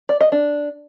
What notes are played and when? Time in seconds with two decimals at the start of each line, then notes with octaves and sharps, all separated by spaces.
0.09 D5
0.21 D#5
0.32 D4